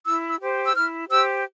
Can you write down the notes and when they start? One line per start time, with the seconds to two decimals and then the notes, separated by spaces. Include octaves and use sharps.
0.05 E4 E6
0.29 E6
0.40 G4 C5
0.66 E6
0.75 E4 F6
1.09 G4 C5 E6